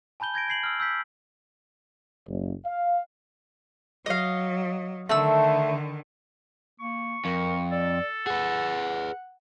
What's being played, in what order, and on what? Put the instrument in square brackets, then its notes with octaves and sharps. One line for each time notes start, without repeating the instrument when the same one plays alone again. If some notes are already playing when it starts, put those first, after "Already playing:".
[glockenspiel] G#5 A5 B5 G6 G7
G6 G#6 A#6 D7
G#6 C7 F#7
E6 F6
E6 G6 B6
[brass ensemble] F#1
F5
[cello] F#3 [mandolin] D#5 F5
[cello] D3 D#3 [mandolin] A3 E6
[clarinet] A#3 [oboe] C#6
[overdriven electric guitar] F2 [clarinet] A#4
[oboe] A4 [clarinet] D5
[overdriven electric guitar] G#4 B4 [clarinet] F#5